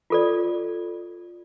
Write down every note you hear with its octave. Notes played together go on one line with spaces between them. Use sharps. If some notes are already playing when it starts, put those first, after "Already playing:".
F4 A4 D5